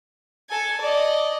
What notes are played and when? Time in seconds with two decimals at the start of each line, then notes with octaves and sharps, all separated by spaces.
0.49 A4 G#5
0.81 D5 D#5